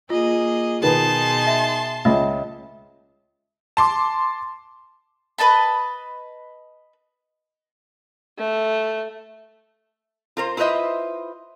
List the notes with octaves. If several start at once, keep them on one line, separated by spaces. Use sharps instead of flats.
A#3 F4 G#4 D#5
B2 D#3 D#4 G#4 B4 A5 C6
E5
C#2 D#5 E5
A5 C6 D6
B4 D#5 A5 B5
A3
F4 A#4 C5
E4 F4 B4 C5 D#5 E5